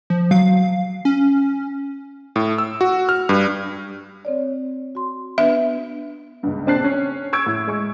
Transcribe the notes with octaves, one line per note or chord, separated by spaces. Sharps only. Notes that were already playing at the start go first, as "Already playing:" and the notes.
F3
F#3 F5
C#4
A2
E6
F#4
F6
G2
C4 C#5 D5
F#4 C6
B3 D4 B4 E5
C#2 G2
A#1 C4 D4 A5 F#6 C7
C#4
C#6 E6 G#6 D7
A2
G#3 C#6